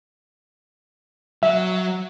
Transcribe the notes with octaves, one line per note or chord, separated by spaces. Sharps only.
F#3 E5